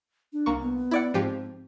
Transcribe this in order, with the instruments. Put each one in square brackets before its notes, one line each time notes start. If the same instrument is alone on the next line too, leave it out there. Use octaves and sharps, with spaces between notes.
[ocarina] D4
[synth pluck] C2 A#3 C#6
[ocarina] B3
[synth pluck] E4 D5 F#5
[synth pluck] G#2 F3 G4 [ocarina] C4